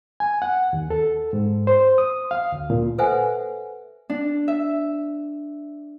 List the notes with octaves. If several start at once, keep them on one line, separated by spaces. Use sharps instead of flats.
G#5
F#5
D#2
A4
G#2
C5
D#6
F5
D2
A#2
A4 B4 C5 E5 F#5 G#5
D4
E5